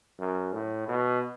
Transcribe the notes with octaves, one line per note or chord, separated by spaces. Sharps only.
F#2
A2
B2